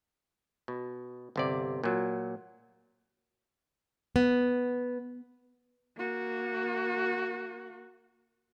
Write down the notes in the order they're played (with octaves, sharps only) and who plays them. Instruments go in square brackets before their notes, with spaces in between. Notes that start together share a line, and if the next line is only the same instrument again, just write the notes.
[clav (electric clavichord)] B2
G1 C3 D5
A#2 F#3
[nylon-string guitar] B3
[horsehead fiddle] A#3 F#4